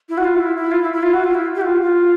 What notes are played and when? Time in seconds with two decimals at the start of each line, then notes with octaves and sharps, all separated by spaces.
0.09 E4
0.18 F#4
0.24 F4
0.40 E4
0.56 E4
0.71 F4
0.82 E4
0.93 E4
1.03 F4
1.14 F#4
1.24 F4
1.34 E4
1.56 G4
1.61 F#4
1.65 F4
1.82 F4